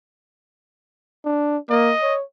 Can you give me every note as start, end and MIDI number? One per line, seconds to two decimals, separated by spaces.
1.25 1.57 62
1.70 1.93 58
1.70 2.15 75
2.02 2.24 73